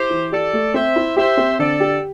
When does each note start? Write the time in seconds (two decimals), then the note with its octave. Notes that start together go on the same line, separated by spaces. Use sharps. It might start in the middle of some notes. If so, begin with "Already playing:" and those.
Already playing: E4 G4 C5
0.10 E3
0.32 G4 A4 D5
0.53 A3
0.74 C4 C5 E5
0.96 E4
1.16 G4 C5 E5
1.37 C4
1.59 D3 A4 D5
1.80 G4